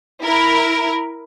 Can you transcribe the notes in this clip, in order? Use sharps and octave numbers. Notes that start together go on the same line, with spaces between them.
E4 A#4